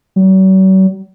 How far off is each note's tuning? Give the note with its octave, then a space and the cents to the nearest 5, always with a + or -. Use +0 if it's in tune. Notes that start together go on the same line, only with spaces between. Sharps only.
F#3 +45